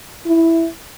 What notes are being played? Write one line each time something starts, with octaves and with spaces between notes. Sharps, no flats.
E4